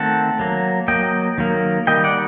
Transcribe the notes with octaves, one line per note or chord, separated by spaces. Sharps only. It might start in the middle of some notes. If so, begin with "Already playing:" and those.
Already playing: D#3 A3 C4 F#5 A5
F#3 A#3
F#3 A#3 D#5 G5
D#3 F#3 A#3
D#3 G3 A#3 D#5 G5
D5 F#5